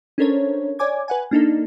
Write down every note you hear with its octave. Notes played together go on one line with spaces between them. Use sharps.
C#4 D4 A4 A#4 C5 C#5
C#5 D5 G#5 D6 G#6
B4 F#5 G#5
A#3 D4 D#4 A4